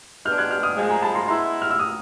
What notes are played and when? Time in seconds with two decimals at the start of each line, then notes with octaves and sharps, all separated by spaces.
0.25 G#3 B3 D4 F6 G6
0.38 F#6 G#6
0.51 F6 G6
0.63 D#6 F6
0.76 A#2 F3 G#3
0.89 G#5 A#5
1.02 A5 B5
1.15 A#5 C6
1.27 G#3 B3 E4 A#5 C6
1.62 F6
1.71 E6
1.79 D#6